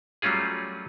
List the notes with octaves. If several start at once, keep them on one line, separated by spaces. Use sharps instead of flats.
F#3 G3 A3 C#4 F4 G#4